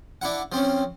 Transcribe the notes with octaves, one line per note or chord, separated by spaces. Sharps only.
D4 E4 F#5
F3 C4 C#4